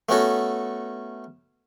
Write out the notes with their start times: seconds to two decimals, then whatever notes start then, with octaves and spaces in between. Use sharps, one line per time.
0.09 A3 B3 C#4 F#4 A4